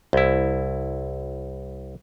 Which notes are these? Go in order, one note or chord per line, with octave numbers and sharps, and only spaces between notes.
C2 E4